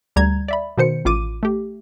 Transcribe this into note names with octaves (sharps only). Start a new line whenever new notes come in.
D2 G3 A#5 G#6
D5 E5 B5
B2 D#3 C5 C#7
A1 F4 D6 D#7
A3 G4